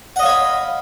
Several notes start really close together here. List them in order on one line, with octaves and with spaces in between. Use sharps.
F#5 D#5 F5 C#5 B5